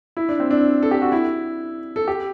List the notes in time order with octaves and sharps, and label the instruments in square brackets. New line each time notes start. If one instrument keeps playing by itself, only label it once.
[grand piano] E4
D4
C4
D4
A4
G4
F#4
E4
A4
G4